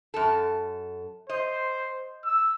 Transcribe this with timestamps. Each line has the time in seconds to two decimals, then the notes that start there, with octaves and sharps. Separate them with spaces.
0.14 F#2 A4
1.29 C5 D#5
2.25 E6